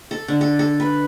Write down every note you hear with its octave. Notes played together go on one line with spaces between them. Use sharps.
A4
D3
A4
A4
B4